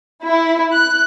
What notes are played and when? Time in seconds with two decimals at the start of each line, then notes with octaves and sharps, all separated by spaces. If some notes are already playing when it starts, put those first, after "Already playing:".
0.24 E4
0.74 F#6